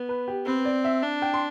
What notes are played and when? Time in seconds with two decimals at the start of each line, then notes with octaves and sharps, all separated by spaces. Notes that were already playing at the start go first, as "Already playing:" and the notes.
Already playing: B3
0.09 B4
0.28 G4
0.46 C4 B4
0.65 D5
0.85 E5
1.03 D4
1.22 G5
1.34 C6